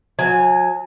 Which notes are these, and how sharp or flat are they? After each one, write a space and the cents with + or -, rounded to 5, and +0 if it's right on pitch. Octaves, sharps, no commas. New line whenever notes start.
F#3 -35 G#5 +0